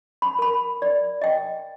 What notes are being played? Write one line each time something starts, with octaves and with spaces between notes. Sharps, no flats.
B5
A#4 B5
D5
D#5 G5